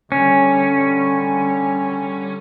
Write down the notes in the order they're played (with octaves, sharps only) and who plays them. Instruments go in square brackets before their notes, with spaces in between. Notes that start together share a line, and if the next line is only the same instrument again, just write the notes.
[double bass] D3 G3 [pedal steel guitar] C#4